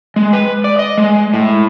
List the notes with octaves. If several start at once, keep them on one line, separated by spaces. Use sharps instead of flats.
G#3
B4
D5
D#5
G#3
A2